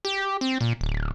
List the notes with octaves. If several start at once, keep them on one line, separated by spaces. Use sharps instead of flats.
G4
C4
A#2
D1